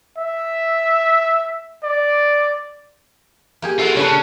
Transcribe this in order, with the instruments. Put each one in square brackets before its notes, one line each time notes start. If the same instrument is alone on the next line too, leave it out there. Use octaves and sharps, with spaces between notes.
[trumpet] E5
D5
[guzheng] A#3 G4 G#4
[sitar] E3 A4 [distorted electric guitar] F4 F#4
[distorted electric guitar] C#3 [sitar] C#4 [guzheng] D4 B4